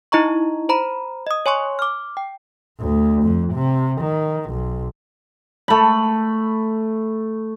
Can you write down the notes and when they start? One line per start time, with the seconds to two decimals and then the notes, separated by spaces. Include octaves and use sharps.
0.12 D#4 E4 D#5 A#5 C#6
0.69 C5 A#5 B5
1.27 D#5 D#6
1.46 C#5 G#5 C6 C#6
1.79 D6 F6
2.17 G5
2.79 D2
3.23 F2
3.54 C3
4.01 D#3
4.51 B1
5.68 A3 B5